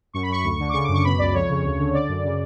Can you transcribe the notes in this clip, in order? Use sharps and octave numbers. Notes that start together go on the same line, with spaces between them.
F#2 C#6
B5
F#2 C#6
D2
D3
D6
C#3 C#6
F#2 D6
C#6
B2 B5
C#2 D5
F2 C#5
C#3
D2
D3
D3 D5
F#2
C#3